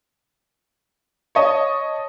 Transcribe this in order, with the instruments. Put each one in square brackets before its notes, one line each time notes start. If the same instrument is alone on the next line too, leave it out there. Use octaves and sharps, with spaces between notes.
[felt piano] C#5 D#5 A5